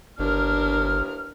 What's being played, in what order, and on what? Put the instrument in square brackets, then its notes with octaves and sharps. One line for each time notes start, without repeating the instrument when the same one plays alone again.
[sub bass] G1 [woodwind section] D#2 E3 F6 [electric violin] D4 A#4